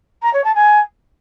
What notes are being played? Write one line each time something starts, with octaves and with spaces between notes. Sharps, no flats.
A#5
C#5
A5
G#5